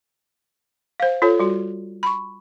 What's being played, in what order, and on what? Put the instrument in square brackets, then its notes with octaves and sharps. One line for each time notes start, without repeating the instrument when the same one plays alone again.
[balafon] C5 F5
F4 A4 C#5
G3 F#4
B5 C#6